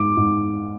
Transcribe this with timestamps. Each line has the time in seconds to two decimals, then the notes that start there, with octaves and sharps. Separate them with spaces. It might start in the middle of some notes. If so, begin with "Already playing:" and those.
Already playing: G#2 D6
0.17 G#2